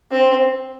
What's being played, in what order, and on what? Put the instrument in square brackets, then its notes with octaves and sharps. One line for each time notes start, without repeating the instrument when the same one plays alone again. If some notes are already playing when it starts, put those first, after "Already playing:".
[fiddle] C4